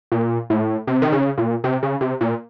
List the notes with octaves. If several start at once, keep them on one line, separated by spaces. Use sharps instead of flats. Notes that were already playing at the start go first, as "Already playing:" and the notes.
A#2
A2
C3
D#3
C#3
A#2
C3
C#3
C3
A#2